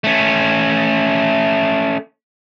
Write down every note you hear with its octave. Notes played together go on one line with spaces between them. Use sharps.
A3 C#4